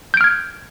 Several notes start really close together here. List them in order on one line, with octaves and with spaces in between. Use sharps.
G6 D7 F6 G#6